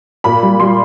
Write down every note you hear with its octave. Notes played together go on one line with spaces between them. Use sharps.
A#2 B5
G3
G3 C6